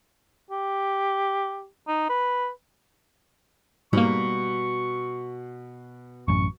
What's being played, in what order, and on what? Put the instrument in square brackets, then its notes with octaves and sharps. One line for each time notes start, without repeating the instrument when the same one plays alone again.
[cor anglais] G4
D#4
B4
[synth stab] G#2 A#3 [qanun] B2 [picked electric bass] G3 [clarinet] C#6
[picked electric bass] A1 F#2 [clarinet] C#6